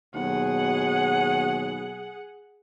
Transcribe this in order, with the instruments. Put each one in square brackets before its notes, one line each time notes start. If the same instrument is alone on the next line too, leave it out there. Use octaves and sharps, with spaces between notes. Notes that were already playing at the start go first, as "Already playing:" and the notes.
[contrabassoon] D#2 [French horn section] B2 F#3 [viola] G#4 F#5